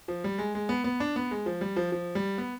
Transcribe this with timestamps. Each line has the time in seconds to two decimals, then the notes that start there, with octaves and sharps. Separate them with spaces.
0.08 F3
0.24 G3
0.38 G#3
0.55 G#3
0.69 B3
0.84 B3
1.00 D4
1.16 B3
1.31 G#3
1.46 F3
1.61 G3
1.76 F3
1.92 F3
2.15 G3
2.38 B3